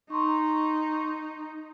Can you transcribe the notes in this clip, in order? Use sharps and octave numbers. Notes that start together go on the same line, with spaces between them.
D#4 A#5 C6 C#6